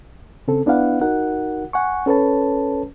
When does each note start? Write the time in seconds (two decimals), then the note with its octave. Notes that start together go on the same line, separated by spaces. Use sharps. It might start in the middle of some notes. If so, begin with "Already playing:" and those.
0.48 C#3 C4 A4
0.66 B3 D4 E4 B4 F5 F#5
1.01 D#4 F#4 A#4 F#5
1.73 F#5 G#5 C#6
2.06 C#4 A4 B4 C#5 A5